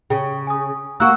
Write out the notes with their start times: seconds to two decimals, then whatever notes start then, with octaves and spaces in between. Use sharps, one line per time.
0.10 C#3 G5
0.47 G#5 D#6
1.00 A#3 F#4 E6 F#6